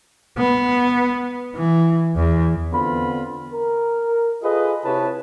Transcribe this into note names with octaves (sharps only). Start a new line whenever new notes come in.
B3
E3
E2
D3 B3 C4 F4 B5
A#4
F4 G#4 A4 B4 D#5
C3 E4 G4 B4 C#5 A5